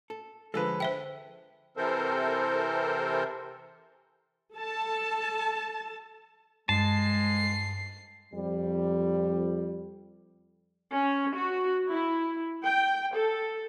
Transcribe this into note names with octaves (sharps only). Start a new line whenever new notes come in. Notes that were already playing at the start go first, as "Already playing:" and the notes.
A4
D3 F3 G#3 A4 B4
C5 E5 G5
C3 E3 C4 A4 A#4 C5
A4 A5
G2 G#3 A5 A6 C7
F2 G3
C#4
F#4
E4
G5
A4